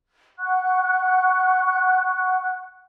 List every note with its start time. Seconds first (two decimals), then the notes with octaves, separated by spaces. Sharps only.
0.39 F#5 C#6 F#6